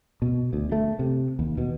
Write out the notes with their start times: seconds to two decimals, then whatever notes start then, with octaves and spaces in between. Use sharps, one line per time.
0.22 B2
0.53 D2
0.72 A3
0.99 C3
1.39 D#2
1.58 B2